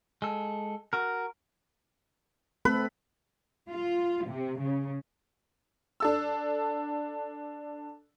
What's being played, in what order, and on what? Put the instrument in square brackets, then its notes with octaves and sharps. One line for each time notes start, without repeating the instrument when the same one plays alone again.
[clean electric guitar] G#3 A4
F#4 A#4
[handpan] A3 C4 A4 [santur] B4
[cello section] F4
C3
C#3
[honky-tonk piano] D4 A4 E6